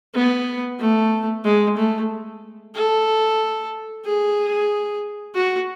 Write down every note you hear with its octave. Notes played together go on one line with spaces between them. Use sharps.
B3
A3
G#3
A3
A4
G#4
F#4